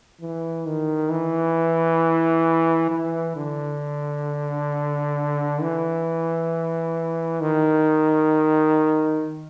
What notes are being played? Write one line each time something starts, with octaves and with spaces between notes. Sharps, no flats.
E3
D#3
E3
E3
D3
E3
D#3